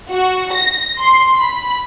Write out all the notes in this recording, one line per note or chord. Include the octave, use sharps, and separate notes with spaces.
F#4
A#6
C6
B5